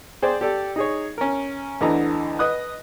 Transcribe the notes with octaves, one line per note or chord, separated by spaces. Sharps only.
G#4 C5 D5 G5
G4 A4 D5
D#4 G#4 C#5
C#4 A#4
D2 D3 E3 D#5 A#5
B4 D#5 D#6 F#6